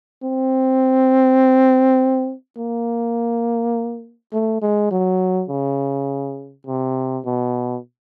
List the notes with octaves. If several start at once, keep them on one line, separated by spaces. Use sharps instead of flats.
C4
A#3
A3
G#3
F#3
C#3
C3
B2